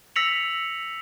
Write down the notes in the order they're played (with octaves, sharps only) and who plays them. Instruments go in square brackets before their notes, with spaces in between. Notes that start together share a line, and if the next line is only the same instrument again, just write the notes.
[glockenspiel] E6 A#6 B6 C#7 F7 F#7